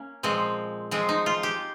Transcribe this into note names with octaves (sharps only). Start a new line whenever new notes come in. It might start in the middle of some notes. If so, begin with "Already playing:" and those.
Already playing: A#3 C#4
A#2 F3 G#3 C4
F3 G#3 C4
D#4
F4
G4